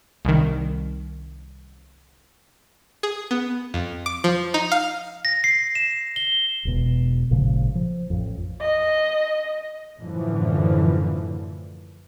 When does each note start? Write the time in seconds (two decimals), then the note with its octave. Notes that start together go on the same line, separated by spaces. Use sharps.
0.25 C2 D#3
3.03 G#4
3.31 B3
3.74 F2
4.06 D6
4.24 F3
4.54 D#4
4.72 F5
5.25 A#6
5.44 C7
5.75 E7
6.16 G7
6.65 E1 B2
7.31 G#1 A#2 C#3 F3
7.75 F3
8.10 A1 F2
8.61 D#5
10.00 F#2 A2 D3 E3 F3